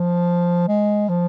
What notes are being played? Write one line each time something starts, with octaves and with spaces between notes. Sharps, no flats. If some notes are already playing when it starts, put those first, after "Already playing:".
Already playing: F3
G#3
F3